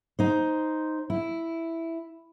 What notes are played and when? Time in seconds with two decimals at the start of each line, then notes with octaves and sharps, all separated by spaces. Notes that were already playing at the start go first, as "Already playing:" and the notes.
0.19 D#4 C5
1.10 E4